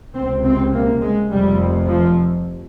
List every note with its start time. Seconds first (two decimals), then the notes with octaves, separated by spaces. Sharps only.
0.14 C#2 C3 C4
0.43 C4
0.73 A#3
1.02 G#3
1.30 F1 F2 C3 G3
1.88 F3